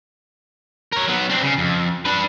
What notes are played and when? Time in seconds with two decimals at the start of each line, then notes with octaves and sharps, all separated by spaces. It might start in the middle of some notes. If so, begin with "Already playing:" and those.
0.92 A#4 C#5
1.08 F#3 B3
1.29 C4 D4
1.42 C#3
1.58 F2
2.05 D4 B4